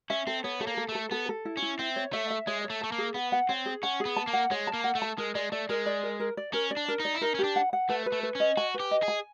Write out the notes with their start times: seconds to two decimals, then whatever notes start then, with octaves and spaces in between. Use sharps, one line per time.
0.10 C#4 E5
0.27 C4 A4
0.44 B3 C#5
0.60 A3 A4
0.67 A#3
0.77 A4
0.89 A3
0.95 A4
1.11 B3 A4
1.29 A4
1.45 E4
1.57 C#4
1.62 E4
1.79 C4 E5
1.96 C#5
2.13 A3 E5
2.30 E5
2.47 G#3 C#5
2.64 C#5
2.70 A3
2.81 A3 A5
2.92 A#3
2.98 G#4
3.14 B3 F#5
3.32 F#5
3.49 C4 C#5
3.66 G#4
3.83 C#4 F#5
4.00 G#4
4.05 B3
4.16 A5
4.27 A#3
4.33 F#5
4.51 G#3 C#5
4.67 A5
4.73 A#3
4.84 F#5
4.95 A3
5.02 A5
5.18 G#3 A#4
5.35 G#3 D5
5.52 A3 D5
5.69 G#3 A#4
5.86 D5
6.03 A#4
6.20 A#4
6.37 D5
6.53 C#4 A#4
6.71 D5
6.77 D4
6.88 A#4
7.00 D#4
7.05 D5
7.15 E4
7.21 D#4 A#4
7.35 C#4
7.39 D4 G4
7.56 F#5
7.73 F#5
7.89 A3 B4
8.06 B4
8.12 A3
8.23 B4
8.35 C#4 D#5
8.57 F#4 G#5
8.74 B4
8.80 G4
8.91 D#5
9.03 G#4
9.08 G#5